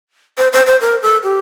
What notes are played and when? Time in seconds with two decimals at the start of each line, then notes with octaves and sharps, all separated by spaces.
0.38 C5
0.53 C5
0.66 C5
0.81 A#4
1.02 A4
1.23 G4